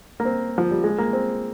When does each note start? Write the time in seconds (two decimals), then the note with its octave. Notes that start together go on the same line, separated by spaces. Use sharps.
0.20 A#3
0.25 C4
0.58 F3
0.71 G3
0.84 G#3
0.98 A#3
1.13 C4